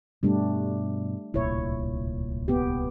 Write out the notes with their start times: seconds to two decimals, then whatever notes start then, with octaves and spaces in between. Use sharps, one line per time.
0.23 G2 B2 G3 A3 D4
1.34 D1 C2 A#2 E4 C#5
2.48 B3 G4